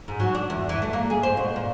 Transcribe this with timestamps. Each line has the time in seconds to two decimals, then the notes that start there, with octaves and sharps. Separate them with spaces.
0.08 G#2
0.20 F#3
0.35 D4
0.50 E2
0.69 E3
0.82 A3
0.93 A#3
1.10 G#4
1.23 C5
1.37 B2
1.56 A#2